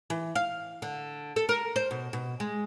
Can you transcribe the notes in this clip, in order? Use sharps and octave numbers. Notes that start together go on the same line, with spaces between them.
E3
F5
D3
A4
A#4
C5
B2
B2
G#3